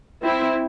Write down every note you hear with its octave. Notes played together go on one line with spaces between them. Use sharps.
C4 E4